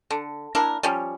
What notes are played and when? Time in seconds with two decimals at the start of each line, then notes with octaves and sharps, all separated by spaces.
0.11 D3
0.55 A#3 D4 E4 A#4
0.83 F3 G3 C#4